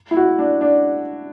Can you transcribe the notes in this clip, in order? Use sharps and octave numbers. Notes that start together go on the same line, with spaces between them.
E4
F#4
D4
D4